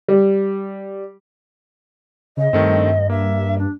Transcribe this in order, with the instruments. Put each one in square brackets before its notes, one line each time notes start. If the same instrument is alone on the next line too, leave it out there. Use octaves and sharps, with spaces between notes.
[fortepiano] G3
[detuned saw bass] C#3 [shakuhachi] D#5
[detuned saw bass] G2 [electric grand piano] D#3 A3 C4
[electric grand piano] A#3 [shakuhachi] E5
[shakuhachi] D4